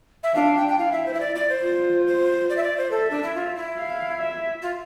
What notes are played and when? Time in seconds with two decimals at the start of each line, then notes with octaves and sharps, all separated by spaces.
0.23 E5
0.35 D4 F5
0.56 G5
0.67 G5
0.78 E4 F5
0.92 E5
1.05 C5
1.13 E5
1.20 D5
1.35 D5
1.49 C5
1.63 F4
2.06 C5
2.49 D5
2.56 E5
2.63 D5
2.77 C5
2.91 A4 E5
3.10 D4
3.23 E4
3.35 F4
3.55 E4
3.77 F5
4.19 E5
4.62 F4